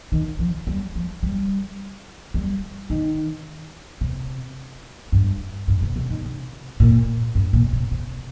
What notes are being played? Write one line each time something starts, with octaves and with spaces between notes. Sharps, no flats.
D#3
F3
G3
F3
G3
G3
D#3
C3
G2
G2
C3
C3
D#3
C3
A#2
G2
A#2
C3
C3